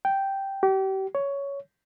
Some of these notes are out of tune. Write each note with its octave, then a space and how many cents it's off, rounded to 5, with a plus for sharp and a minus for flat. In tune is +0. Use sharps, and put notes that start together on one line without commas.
G5 -5
G4 -35
C#5 +10